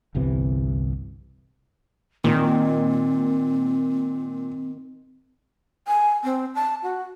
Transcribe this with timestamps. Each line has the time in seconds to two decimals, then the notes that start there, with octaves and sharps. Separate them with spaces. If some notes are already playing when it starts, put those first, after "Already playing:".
0.15 G1 C2 C3 E3
2.24 A#2 D#3 C4
5.88 G#5
6.24 C4
6.55 A5
6.83 F#4